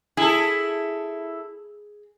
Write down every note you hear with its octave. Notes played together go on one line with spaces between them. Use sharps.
E4 G#4 A4